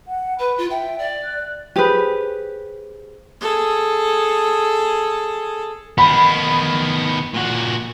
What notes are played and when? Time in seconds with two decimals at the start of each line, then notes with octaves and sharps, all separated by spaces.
0.08 F#5
0.39 B4 B5
0.58 F4
0.70 E5 G5
0.99 D5
1.24 F#6
1.76 G4 G#4 B4 C5 G#5
3.41 G#4 A4
5.98 D#3 B3 B5
7.34 A#2 F#4